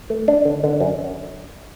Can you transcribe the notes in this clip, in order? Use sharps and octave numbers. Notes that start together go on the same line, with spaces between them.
A3
D4
D3
D3
F#2